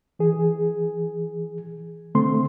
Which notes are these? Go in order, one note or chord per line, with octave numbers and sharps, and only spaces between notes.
E3 G#4
D3 A3 C4 C6